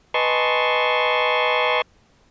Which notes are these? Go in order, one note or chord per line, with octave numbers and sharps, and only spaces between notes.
B4 D#5 G#5 A5 C6 C#6